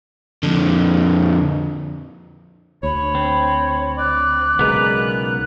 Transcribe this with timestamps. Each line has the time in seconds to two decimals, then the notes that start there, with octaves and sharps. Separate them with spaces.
0.43 F2 D3
2.83 D2 C#5 B5
3.15 C4
3.98 D5 F#6
4.59 B1 C#3 G#3 B3 A#4 B4